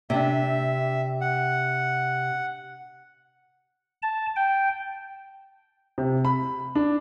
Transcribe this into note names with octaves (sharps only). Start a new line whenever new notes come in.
C3 D4 E5
F#5
A5
G5
C3
B5
D4